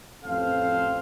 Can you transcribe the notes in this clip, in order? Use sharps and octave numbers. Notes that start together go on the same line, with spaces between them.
A1 F2 C4 A4 C5 F5